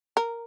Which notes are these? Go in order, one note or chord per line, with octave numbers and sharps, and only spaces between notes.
A#4